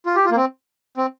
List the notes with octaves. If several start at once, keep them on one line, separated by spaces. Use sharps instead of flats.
F4
G4
F4
A#3
C4
C4